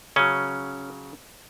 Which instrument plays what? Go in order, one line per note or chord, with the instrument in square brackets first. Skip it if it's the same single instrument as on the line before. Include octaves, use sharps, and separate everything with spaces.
[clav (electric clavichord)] C#3 F#3 C#4